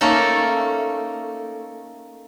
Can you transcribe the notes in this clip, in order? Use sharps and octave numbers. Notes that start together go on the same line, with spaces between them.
A3 A#3 C#4 D#4 A4